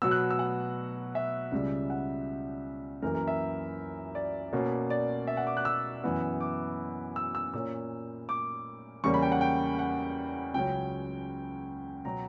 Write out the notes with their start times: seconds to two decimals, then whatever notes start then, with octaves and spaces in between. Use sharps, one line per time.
0.02 B2 F#3 B3 E6
0.11 F#6
0.30 E6
0.39 F#5
1.15 E5
1.52 C#2 C#3 G3
1.90 F#5
3.02 F#2 E3 A#3 A#4
3.15 A#4
3.28 E5
4.15 D5
4.53 B2 A#3 C#4
4.90 D5
5.27 E5
5.37 F#5
5.47 D6
5.57 F#6
5.65 E6
6.04 F#2 E3 B3
6.41 D6
7.16 E6
7.35 E6
7.54 A#2 A#3 C#4 E6
8.29 D6
9.04 E2 C#3 G3 A#3 C#4 C#6
9.14 B5
9.22 G5
9.32 F#5
9.41 G5
9.79 F#5
10.54 C#2 C#3 F#3 C#4 G5
12.05 B2 F#3 A#5